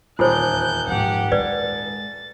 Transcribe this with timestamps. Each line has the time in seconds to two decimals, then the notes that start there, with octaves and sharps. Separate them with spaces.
0.19 D#1 E2 F4 C5 C#5 F#6 G6
0.87 G#2 F3 G4 F#5
1.32 G#3 B4 D5 A6